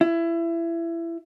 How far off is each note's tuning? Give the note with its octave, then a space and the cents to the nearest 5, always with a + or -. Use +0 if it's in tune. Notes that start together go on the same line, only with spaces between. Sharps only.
E4 +25